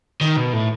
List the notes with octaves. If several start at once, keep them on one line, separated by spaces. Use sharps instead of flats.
D#3
B2
A2